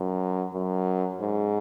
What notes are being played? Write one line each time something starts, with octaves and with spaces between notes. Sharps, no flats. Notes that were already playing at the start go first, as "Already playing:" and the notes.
Already playing: F#2
F#2
G#2